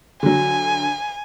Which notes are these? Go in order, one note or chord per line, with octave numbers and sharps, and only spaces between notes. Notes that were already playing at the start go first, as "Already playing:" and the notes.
D3 F#3 G#5